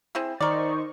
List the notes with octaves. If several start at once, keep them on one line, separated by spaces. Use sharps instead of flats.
C4 E4 G#4
D#3 A#4 C5 D5 D#5 C#6